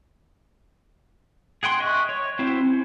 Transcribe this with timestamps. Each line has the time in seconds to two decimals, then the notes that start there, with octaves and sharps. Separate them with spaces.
1.63 G#4 F#5 G5 C6
1.80 D#5 E5 C#6 F#6
2.09 C#5
2.39 C4 E4 F#4 C5
2.65 C#4